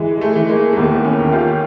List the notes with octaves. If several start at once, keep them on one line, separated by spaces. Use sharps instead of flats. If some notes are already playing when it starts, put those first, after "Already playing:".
Already playing: E3 G#3
G#3
A3
E3
G#3 A#3
A#3
D#2 A3 B3
B3 C#4
D#2
F4 G4